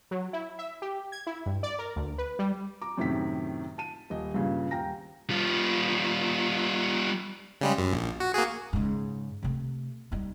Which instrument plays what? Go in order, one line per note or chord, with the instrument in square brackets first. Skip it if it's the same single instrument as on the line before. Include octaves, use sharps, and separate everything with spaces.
[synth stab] F#3
E4
E5
G4
G#6
E4
G2
D5
A#4
D2
B4
G3
[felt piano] A#5 D6
F#2 A2 C3 D#3 E4 B6
A5 D#7
D#1 D#5
G2 A#2 C#3
D#1 F5 G5 A#5 A#6
[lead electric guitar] G3 F4
[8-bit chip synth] C#3 G3 G#3
F#2
A#1
F#4
A#3 F#4 G#4
[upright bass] G#2 C#3
C3 A3
G3 D#4